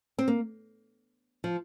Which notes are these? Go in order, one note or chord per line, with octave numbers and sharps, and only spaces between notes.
C4
A#3
F3